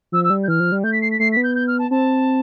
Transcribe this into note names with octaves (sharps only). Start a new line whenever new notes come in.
F3 E6
E6
G3
G6
E3 F6
F3
G3
A3 G6
B6
C7
B6
A3 C7
B6
B3
G6
G6
F6
A5
C4 A5